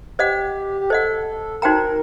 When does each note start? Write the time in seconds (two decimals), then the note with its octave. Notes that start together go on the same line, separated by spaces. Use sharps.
0.19 G4 C5 D#5 F#5
0.81 G4
0.90 A4 C5 D#5 F#5
1.62 D#4 F#4 A#4 C5 G5 A#5